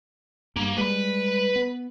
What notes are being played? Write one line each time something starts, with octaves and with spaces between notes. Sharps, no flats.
G2 G3 A#3
G3 G#3 B4 B5
B3